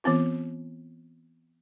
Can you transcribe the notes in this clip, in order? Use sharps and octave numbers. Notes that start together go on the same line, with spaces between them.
E3 B3 C4 F4